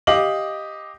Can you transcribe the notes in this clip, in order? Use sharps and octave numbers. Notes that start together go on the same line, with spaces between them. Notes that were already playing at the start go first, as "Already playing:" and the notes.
G4 D#5 F5 D6 F#7